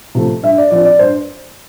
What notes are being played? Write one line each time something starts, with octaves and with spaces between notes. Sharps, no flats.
C3 F3 A3
G2 E5
D5
F3 C4 D5
D5
G2 C5